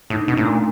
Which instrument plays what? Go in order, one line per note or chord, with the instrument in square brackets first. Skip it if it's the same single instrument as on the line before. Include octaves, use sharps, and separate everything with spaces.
[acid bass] A2 [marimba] D#4
[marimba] D4
[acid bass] B2 [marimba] C#4
[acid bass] A2 [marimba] A#3
[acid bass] A#2 [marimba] A3